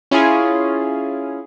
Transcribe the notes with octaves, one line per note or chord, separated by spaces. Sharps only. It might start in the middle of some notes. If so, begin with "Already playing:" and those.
C#4 E4 F4 G#4